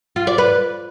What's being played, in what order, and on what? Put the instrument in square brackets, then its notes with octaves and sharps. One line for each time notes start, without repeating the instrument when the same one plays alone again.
[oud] F4
D5
B4